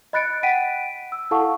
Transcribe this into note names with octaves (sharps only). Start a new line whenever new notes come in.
D#5 B5 F#6 A6 C#7 D7
F#5 G5 B6 D7 D#7
E6
E4 A4 F5 F#5 A5 C#6